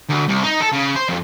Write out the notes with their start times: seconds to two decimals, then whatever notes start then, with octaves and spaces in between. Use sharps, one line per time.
0.10 D2
0.28 C2
0.44 D#4
0.61 A4
0.73 C#3
0.96 C5
1.09 F2